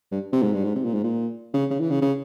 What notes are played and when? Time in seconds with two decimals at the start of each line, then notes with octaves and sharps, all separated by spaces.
0.12 G2
0.33 C3
0.43 G#2
0.53 G2
0.64 G#2
0.75 C3
0.84 A#2
0.94 G#2
1.04 A#2
1.54 C#3
1.70 C#3
1.80 E3
1.91 C#3
2.02 C#3